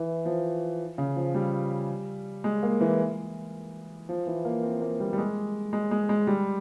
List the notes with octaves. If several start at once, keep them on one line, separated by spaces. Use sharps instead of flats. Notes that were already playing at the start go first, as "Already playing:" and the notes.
Already playing: E3
F3
C#3
F3
G3
G#3
A#3
E3
F3
E3
A#3
C4
A#3
G3
G3
G#3
G#3
G#3
G#3
G3